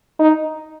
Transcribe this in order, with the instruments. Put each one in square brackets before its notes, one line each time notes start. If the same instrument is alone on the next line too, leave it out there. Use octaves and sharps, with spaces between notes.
[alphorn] D#4